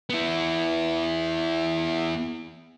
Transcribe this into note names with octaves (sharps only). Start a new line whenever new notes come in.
B3 E4